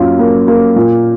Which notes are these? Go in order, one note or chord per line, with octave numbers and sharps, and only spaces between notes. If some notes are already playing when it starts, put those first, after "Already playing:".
Already playing: F#2 A#3 F4
A#3
A#3
A#2